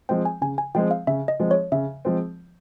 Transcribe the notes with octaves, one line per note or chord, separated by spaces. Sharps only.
F3 G#3 C4 G5
G#5
C#3 G#5
G#5
F3 G#3 C4 G5
F5
C#3 E5
D#5
F3 G#3 C4
C#5
C#3 E5
F3 G#3 C4